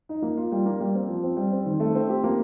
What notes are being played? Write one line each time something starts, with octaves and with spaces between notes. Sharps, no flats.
D#4
A#3
F4
G3
A#3
G3
C4
F3
C4
G3
C4
D#3
A3
C4
G4
A#3